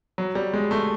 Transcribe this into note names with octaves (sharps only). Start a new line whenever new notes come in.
F#3
G3
G#3
A3